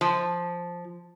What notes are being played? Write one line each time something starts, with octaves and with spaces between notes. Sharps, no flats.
F3